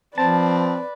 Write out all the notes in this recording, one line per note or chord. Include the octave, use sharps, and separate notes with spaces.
F3 C4 B4 D5 A5